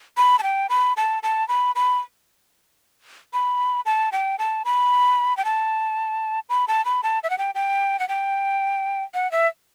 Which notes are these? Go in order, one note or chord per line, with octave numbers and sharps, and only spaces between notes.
B5
A5
G5
B5
A5
A5
B5
B5
B5
A5
G5
A5
B5
G5
A5
B5
A5
B5
A5
E5
F#5
G5
G5
F#5
G5
F#5
E5